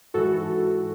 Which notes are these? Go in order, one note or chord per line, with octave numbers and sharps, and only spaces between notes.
G#2 E3 F#4 A4